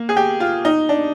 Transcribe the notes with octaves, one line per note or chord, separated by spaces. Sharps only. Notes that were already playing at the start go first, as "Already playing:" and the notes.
Already playing: A#3
G#4
G4
F4
D#4
D4